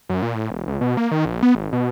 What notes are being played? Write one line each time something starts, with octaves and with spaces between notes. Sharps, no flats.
F#2
A#2
A2
E1
C#2
B2
A#3
D#3
A#1
B3
G#1
B2